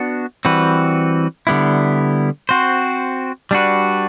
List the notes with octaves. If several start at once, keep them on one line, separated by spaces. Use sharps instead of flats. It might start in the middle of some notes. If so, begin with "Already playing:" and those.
Already playing: B3 D4 F#4
E3 G3 C4 F#4 B4
D3 G3 B3 E4
C4 F#4 C5
G3 D4 F#4 B4